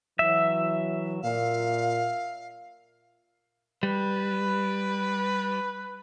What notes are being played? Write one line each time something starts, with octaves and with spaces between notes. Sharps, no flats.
E3 F#3 E5
A#2 F5
G3 B4